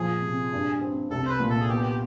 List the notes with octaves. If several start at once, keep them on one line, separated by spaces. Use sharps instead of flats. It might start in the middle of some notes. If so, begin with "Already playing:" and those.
Already playing: A#2 F3 G#4
C3
G2
C4
C2 A4
C5
B4
A#2
A4
G#4
B3 G4
G4